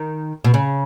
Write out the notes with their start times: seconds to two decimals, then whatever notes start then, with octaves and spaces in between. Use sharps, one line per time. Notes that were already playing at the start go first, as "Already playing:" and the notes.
Already playing: D#3
0.45 B2
0.54 C#3